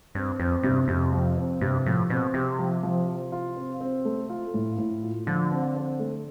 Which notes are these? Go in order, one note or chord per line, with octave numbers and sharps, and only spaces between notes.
G2 C4
F2 C4
G2 C3
F2 C3
F3
C4
G2 C3
A2 F3
B2 C4
C3 G4
F3
F3
F4
F4
C4
C4
A3
F4
A2
A2
F4
D3 F3
C4
C4
A3